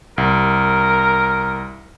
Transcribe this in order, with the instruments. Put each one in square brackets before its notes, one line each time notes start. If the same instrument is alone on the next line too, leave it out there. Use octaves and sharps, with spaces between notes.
[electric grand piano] C2 [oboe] A#4